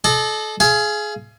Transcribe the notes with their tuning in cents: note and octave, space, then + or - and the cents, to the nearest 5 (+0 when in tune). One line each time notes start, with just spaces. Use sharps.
A4 -30 D#5 -40
G#4 +20 F5 -30